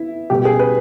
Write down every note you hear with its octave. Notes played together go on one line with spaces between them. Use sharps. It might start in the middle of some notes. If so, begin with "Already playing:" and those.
Already playing: B3 E4
B2 G3 B3 G4
G#4
B4